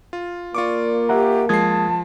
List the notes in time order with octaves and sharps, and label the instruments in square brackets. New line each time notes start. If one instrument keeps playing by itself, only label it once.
[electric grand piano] F4
[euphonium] A#3 [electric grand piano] F4 C#6 D6 [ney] D5
[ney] G4 [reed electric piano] E5 F#5 A#5
[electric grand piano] F3 C7 [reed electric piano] G#3 D#6 G#6 [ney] A5